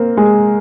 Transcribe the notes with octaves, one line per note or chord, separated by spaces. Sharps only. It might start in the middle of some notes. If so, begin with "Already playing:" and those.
Already playing: A#3 C4
G#3